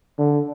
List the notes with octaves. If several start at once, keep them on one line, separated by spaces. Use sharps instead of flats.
D3